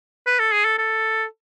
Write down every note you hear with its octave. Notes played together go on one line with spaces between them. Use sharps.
B4
A4
G#4
A4
A4